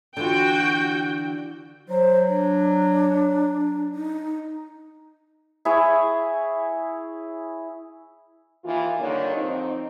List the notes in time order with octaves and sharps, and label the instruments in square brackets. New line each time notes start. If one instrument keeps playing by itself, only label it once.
[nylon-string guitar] D3 E3 F4 [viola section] F#4 G5
[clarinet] F#3 [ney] C5
[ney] D4
D#4
[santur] E4 G#4 C#5
[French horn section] D#2 E3 F4
D3 D#3 G3 A#3 C#5
F2 C4 D#4